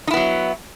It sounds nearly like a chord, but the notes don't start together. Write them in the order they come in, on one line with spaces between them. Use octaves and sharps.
D#4 E4 B3 F#3